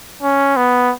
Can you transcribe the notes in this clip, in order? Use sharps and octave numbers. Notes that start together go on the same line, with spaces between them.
C#4
B3